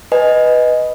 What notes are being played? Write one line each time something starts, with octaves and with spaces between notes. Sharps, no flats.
B4 D#5 G#5